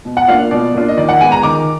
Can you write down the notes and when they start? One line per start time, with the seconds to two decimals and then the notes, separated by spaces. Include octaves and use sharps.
0.05 B2
0.17 F#5
0.28 A#3 D4 F4 F5
0.51 B2 D5
0.74 A#3 D4 F4
0.88 D#5
0.97 D#3 D5
1.09 F#5
1.20 G#3 B3 G#5
1.32 A#5
1.43 D#3 D6